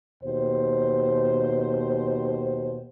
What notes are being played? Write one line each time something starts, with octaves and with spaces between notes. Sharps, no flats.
D#2 B2 C5